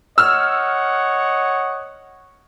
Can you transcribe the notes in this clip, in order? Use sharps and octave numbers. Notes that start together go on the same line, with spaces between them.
C#5 D#5 F#5 E6 F6